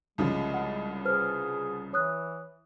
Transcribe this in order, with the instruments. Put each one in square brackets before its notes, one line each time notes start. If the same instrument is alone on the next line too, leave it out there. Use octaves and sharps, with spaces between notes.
[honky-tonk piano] C2 C#3 F3 [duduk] G#3
[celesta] F#5
[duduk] G#4 [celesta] B4 C5 F6
[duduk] E3 [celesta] C#5 D#6 F#6